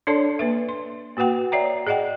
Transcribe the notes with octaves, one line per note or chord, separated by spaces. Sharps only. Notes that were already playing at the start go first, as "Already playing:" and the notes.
D4 A4 C#5 D5 A5 C6
A#3 B4 E5
C6
A#3 F#4 B4 F#5 G5
C#5 D5 E5 G5 A#5
G#4 D5 D#5 F#5 G5